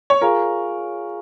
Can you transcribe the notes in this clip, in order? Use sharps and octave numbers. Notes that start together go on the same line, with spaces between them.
C#5
F4 G#4 A#4 F5 G#5 C#6